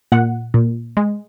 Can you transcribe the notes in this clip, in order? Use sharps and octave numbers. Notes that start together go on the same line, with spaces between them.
A#2 F#5
A#2
G#3